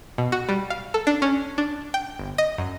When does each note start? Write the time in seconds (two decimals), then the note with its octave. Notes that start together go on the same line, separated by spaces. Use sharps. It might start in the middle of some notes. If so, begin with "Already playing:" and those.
0.18 B2
0.32 F#4
0.49 G3
0.70 F5
0.94 A4
1.07 D4
1.22 C#4
1.58 D4
1.94 G5
2.19 G1
2.38 D#5
2.58 F#2